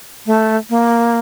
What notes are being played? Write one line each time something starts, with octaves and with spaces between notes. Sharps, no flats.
A3
A#3